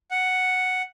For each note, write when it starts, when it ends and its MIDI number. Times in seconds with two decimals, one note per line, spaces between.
0.11 0.82 78